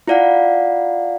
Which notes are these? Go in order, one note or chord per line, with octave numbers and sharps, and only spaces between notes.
E4 F4 D5 F5 F#5